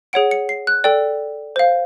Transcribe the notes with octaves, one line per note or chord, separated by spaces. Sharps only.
G#4 C#5 F#5 D7
C#7
C7
F#6
A4 D5 G5
C5 F5